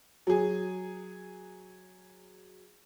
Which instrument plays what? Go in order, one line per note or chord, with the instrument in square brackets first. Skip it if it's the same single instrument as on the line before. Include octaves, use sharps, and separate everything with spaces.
[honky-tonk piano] F#3 G#4